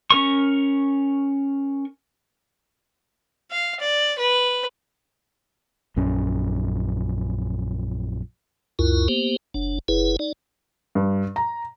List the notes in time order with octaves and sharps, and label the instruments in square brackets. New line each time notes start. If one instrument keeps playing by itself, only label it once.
[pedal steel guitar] C#4 A#4 C#6
[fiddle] F5
D5
B4
[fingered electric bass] A#1 F#2 C#4
[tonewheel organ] C#2 F#2 E4 F4 A#4
A#3 B3 G4 C5
F#1 D4
F#1 E4 G#4 B4
D#4 D5
[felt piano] G2
A#5